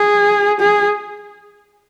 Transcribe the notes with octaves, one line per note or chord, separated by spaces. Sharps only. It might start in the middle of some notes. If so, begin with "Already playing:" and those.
Already playing: G#4
G#4